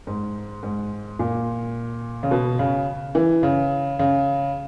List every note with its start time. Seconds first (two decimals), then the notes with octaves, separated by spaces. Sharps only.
0.07 G#2
0.63 G#2
1.19 A#2
2.23 C#3
2.31 B2
2.59 C#3
3.15 E3
3.43 C#3
3.99 C#3